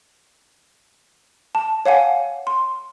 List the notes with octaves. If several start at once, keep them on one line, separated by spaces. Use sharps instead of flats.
A5
C#5 F5 F#5 G#5
C6